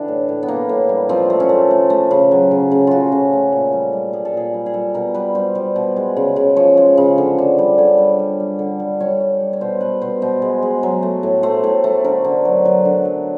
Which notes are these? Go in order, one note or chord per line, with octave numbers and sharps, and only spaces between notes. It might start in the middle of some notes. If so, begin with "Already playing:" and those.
Already playing: D3 E3 D4 G4
A2
A2
B3
E3 A#3
A2
G3
F3 C4
A3
C#4
A3
A3
A3
C#3
F#3
C#3
C#3
C#3 F4 F#4
C#3
A3
A#2
G3
G3
G3 G#4
A4
A#2 G#4
G3
G#4
G3 A4
B2 A#4
G3 B4
G3 C5
G3
B2
G#3
C#3
C#3
F3 C#5
G#3
C#3
D3
D3
G3
D3 C#5
G3
G3
G3
D3
G3
G3 C#5
G3
G3
C#5
B2 C5
B2 B4
B2 C5
B2 C5
G#3
G#3
F#3
A3
A2
A3 C5
A2
A3
D3 A#4
D3
F#3
F#3
D3
F#3